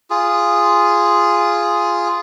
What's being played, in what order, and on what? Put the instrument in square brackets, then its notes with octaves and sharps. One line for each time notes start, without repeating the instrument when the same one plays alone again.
[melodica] F4 G#4